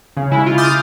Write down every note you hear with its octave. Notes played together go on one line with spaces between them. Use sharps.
C#3
C#3 G#3 E4
F4
D6 D#6 F6 G6 A6